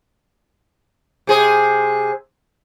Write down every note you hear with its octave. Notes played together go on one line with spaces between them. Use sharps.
C3 G#4 C5